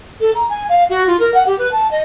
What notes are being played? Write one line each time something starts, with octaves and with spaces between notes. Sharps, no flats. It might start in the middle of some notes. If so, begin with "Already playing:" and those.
A4
A#5
G#5
F5
F#4
F4
A#4
F#5
G4
B4
A5
D#5